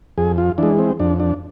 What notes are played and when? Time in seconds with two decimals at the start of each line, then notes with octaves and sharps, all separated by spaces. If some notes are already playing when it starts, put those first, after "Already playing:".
0.18 F2 G#4
0.38 F4
0.58 E3 G#3 D4
0.79 C4
1.00 F2 D4
1.20 D4